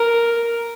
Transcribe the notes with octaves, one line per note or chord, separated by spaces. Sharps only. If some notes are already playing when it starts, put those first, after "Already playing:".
Already playing: A#4